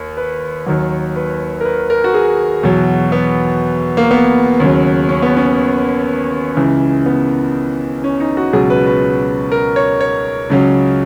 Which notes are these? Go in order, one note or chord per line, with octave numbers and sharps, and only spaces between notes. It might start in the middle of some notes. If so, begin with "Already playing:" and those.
Already playing: D#2
B4
D#2 D#3 F#3
B4
A#4
B4
A#4
F#4
G#4
E2 B2 F#3
B3
A#3
B3
D#2 C#3 F#3
C#4
B3
C#4
C#2 C#3 E3
B3
C#4
D#4
F#4
C#2 B2 F#3 G#4
B4
B4
A#4
C#5
C#5
C#2 C#3 F#3